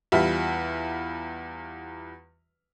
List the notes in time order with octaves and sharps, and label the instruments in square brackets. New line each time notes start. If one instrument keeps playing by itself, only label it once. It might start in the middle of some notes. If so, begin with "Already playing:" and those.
[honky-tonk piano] E2 G3 F4 E5